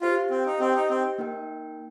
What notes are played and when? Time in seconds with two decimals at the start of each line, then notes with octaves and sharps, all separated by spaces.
0.01 F4 G4 C5 F5
0.31 C4
0.46 D#4
0.60 C4 G4 D#5 G5
0.75 D#4
0.90 C4
1.18 A#3 D#4 A#4 G5